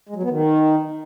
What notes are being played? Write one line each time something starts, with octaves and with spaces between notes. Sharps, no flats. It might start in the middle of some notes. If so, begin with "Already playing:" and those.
G#3
F#3
B3
D#3